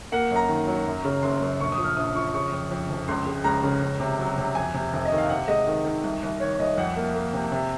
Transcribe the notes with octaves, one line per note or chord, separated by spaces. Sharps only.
A#3 F#5
F#2 A#5
D#3
F#3
F#2
C#3
F#1 C6
F#2
A#1 C#6
D#6
F3
F6
A#1 D#6
F3 C#6
C#3 C#6
F2
F2
F1
C#2 C6
G#3
C#2 A#5
C#3
C#2
C3
F#3
C3
F2 G#5
C3
F1
D#5
D#3
F5
C3 F#5
G#3 D#5
D#3
D#3
C2
C2
D#3 C#5
C2 D#5
F2 F#5
A#3
A#3
C3
C3